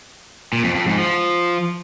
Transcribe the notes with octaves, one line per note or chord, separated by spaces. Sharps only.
A#2
F2
F2
G#2
F3